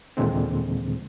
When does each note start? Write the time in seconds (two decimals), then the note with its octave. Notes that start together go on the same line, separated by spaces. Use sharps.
0.17 D#2 A#2 D3 E3 G#3 C4